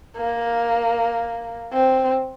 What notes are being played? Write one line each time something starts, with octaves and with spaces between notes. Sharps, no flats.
A#3
C4